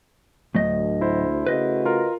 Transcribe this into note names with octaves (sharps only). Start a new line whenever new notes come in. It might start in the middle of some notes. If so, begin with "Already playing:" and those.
D2 A2 F#3 D#5
E4 C5
C#3 A3 F#4 B4 D#5
F4 A#4